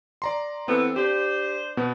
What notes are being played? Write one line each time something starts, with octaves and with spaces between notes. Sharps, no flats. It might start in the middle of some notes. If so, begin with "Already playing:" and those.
D5 A#5 C6
E3 B3 C4 A4
D4 G4 C5
B2 B3